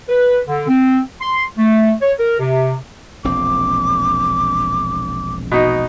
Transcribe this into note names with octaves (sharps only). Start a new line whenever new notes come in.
B4
D3
C4
C6
A3
C#5
A#4
C3
E1 A#1 C4 D6
B2 D#4